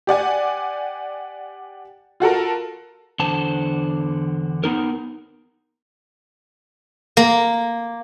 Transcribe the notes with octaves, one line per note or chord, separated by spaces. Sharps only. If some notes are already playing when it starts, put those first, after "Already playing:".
G4 D5 F#5 G#5
F4 F#4 A4 A#4
E2 D3 C5 A5
B3 D#4 A#4
A#3